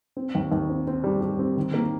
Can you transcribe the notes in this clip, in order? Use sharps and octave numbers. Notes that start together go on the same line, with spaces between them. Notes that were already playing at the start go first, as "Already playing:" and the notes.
C4
D#2
D#2
C4
C4
G3
G3
C4
D#3
A#3